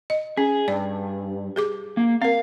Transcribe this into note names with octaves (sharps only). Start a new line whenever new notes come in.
D#5
C#4 G#4
G2 D5
G4 G#4 D6
A#3
C4 A#4 F5